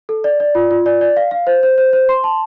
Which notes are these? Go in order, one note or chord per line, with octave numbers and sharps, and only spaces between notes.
A4
D5
D5
F4
F4
D5
D5
F5
F5
C5
C5
C5
C5
C6
A5